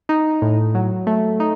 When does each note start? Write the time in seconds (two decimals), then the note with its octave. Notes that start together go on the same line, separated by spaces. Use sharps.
0.09 D#4
0.42 A2
0.75 F#3
1.07 A3
1.40 D#4